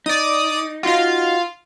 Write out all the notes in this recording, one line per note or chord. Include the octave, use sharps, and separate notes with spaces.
D#4 D5 D#6
D#4 F4 F#4 F5